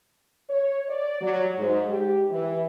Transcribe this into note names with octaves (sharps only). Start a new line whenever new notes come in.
C#5
D5
F#3
G#2
G4
E3